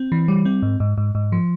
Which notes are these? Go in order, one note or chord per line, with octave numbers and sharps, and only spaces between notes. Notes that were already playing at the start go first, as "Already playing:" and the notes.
Already playing: C4
E3
G3
C4
G#2
G#2
G#2
G#2
F3